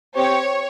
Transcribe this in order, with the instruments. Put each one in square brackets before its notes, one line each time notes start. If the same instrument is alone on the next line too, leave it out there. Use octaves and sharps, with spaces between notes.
[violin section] C4 G4 C#5